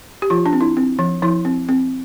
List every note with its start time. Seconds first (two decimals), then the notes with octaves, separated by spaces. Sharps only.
0.22 G4
0.30 F3 F4
0.46 D4
0.53 C4
0.61 E4
0.77 C4
0.99 F3
1.22 F3 E4
1.45 C4
1.69 C4